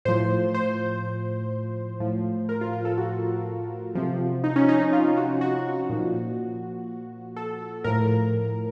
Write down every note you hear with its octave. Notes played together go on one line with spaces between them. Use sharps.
A2 F3 C5
C5
A2 F3
A#4
F4
F4
A4
F#4
C3 F3
D#4
C#4
D#4
F4
F#4
F#4
A#2 F3
A4
A2 F3 A#4